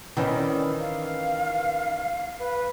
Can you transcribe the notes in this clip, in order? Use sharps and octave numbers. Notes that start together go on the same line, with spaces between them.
D#3 E3 C#4 D5
F5
B4